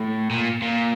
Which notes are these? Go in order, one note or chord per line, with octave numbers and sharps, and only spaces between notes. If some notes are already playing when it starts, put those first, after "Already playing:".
Already playing: A2
A#2
A#2